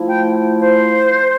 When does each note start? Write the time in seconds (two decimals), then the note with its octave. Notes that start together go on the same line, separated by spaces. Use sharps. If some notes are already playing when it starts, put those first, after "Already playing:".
Already playing: F3 A3 E4
0.08 G5
0.59 C5